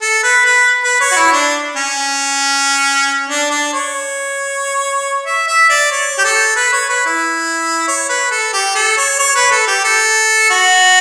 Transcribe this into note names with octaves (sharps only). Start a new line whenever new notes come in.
A4
B4
B4
B4
C#5
F#4
E4
D4
C#4
D4
D4
C#5
E5
E5
D5
C#5
G4
A4
B4
C#5
B4
E4
C#5
B4
A4
G4
A4
C#5
C#5
B4
A4
G4
A4
F#4